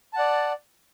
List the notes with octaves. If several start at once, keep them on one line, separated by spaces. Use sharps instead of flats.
D5 F#5 A5